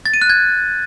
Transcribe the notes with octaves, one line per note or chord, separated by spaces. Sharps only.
A6
D#7
F#6
G#6